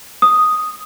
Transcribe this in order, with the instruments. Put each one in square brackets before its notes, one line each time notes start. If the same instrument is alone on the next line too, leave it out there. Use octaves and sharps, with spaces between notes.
[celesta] D#6